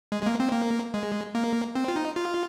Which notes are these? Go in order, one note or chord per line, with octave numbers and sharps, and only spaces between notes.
G#3
G#3
A#3
C4
A#3
G#3
A#3
C4
F4
D#4
F4